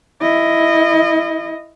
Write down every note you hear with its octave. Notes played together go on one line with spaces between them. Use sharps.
E4 D#5